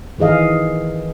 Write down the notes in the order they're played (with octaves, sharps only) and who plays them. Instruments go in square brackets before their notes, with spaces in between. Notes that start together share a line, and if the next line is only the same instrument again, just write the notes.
[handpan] D#3 E3 G#4 D#5 F5